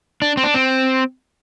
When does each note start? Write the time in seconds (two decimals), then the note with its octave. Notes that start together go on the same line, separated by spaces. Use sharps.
0.22 D4
0.37 C4
0.44 D4
0.54 C4